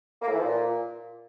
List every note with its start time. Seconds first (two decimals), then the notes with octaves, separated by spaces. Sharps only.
0.22 A#3
0.27 A2
0.33 E3
0.39 F3
0.45 A#2